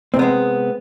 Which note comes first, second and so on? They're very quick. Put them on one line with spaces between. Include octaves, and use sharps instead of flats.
C4 C3 B3 G#3